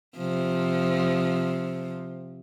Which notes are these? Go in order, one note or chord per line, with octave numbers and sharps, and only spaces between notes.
C3 F3